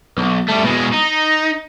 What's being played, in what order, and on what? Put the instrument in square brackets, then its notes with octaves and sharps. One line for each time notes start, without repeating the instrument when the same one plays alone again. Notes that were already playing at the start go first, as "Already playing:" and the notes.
[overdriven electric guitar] B1
G3 A3
B2 G#3
D#4